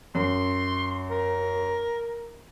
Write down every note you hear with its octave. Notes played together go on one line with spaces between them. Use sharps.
F#2 C6
A#4